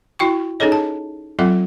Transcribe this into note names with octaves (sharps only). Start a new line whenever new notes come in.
E4 F#4 G5 C#6
C#4 D#4 G#4 A4 C#5 D#5
A5
F#3 C4 F4 A4 E5 F#5